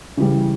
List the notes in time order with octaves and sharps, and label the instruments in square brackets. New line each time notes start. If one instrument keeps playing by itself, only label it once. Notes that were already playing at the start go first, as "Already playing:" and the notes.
[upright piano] C#3 E3 G3